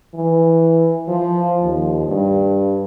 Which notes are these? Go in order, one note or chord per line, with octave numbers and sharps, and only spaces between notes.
E3
F3
D#2
G2